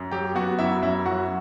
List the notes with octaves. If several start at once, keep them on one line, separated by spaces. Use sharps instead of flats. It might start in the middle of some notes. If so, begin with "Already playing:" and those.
Already playing: F#2
F#3 G4 G5
B3 F#4 F#5
F#2 E4 E5
F#2 E4 E5
F#3 F#4 F#5